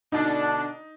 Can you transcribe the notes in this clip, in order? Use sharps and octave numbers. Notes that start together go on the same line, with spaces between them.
B2 D3 D4 D#4